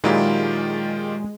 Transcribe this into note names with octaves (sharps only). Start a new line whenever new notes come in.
A#2 D#3 F#3 G#3 E4 F4 G4